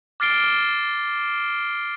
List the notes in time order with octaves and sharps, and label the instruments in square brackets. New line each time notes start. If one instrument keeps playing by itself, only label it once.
[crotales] D6 F6 A6 C7 D7 G7